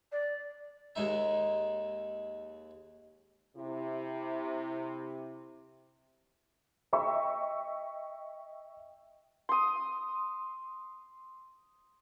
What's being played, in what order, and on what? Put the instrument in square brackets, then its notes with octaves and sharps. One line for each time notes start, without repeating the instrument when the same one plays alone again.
[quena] D5
[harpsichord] D#2 G#3 D#4 E5
[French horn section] C3 E4
[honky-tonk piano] D#5 E5 G5 C#6 E6
[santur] C6 D#6